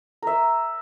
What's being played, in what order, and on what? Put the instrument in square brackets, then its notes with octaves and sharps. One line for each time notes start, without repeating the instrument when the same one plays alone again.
[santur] A#4 E5